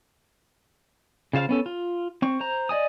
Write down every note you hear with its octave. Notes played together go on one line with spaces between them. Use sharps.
C#3 F4 C5 F5 F6
B3 C#4 A4
F4
C4 C#6
C5 A#5
D5 D#5 G#5 D#6